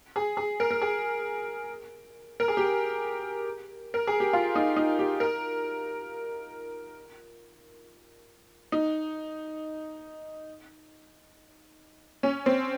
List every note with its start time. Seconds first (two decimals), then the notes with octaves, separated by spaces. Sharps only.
0.16 G#4
0.37 G#4
0.60 A#4
0.71 A#4
0.82 G#4
2.40 A#4
2.48 G#4
2.57 G4
3.94 A#4
4.07 G#4
4.20 G4
4.33 F4
4.56 D#4
4.76 D#4
4.99 G4
5.20 A#4
8.72 D#4
12.23 C#4
12.46 C4